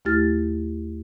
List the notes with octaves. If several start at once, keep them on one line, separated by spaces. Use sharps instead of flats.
D#2 A3 E4 G4 F6 A6